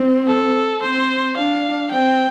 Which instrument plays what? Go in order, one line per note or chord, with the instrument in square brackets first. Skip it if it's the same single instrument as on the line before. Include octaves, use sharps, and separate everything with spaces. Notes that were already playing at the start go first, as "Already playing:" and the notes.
Already playing: [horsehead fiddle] C4
[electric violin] A4
[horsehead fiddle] C4 [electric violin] C5
[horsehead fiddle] D4 [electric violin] F5
[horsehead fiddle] C4 [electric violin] G5